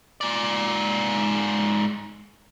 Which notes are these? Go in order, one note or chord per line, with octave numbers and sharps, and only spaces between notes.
G#2 D5